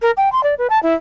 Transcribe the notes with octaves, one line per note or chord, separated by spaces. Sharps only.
A#4
G5
C6
D5
B4
A5
E4